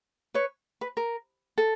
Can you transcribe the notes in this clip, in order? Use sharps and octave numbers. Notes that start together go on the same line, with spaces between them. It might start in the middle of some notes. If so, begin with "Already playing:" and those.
B4 C#5
B4
A#4
A4